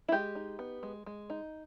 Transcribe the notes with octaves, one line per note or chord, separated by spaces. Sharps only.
E4
G#3 G4
D#4
B3
G#3
G#3
D#4